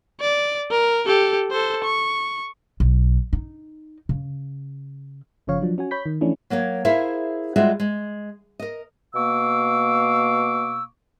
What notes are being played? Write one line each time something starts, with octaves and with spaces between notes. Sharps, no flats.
D5
A#4
G4 A4
A4 C5
C#6
B1
D#4
C#3
G1 C#3 F3 C#5 F5
F3 F#3 D4
C#4 F#4 G#5
C#5 B5 G6 B6
D#3
E3 F3 A3 C#4 D4 E4
F#3 A#3 A#4 C#5
E4 G#4 A#4 C5 E5 F5
G3 G#3 F4 F#4 G#4 E5
G#3
A#4 D#5
B2 A#3 F5 C#6 D6 E6